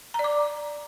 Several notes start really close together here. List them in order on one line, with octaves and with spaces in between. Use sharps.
A#5 D5 D6